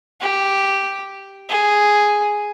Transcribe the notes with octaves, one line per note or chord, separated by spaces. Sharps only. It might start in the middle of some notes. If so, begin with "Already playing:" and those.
G4
G#4